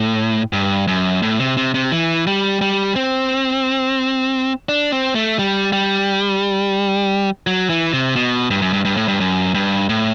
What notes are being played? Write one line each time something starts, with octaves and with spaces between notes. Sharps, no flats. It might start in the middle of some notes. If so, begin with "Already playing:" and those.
Already playing: A2
G2
F#2
A2
C3
C3
C3
E3
G3
G3
C4
D4
C4
A3
G3
G3
F#3
E3
C3
B2
G2
F#2
G2
G2
A2
G2
F#2
G2
A2